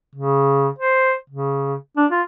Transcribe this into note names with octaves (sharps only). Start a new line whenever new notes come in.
C#3
C5
C#3
D4
F4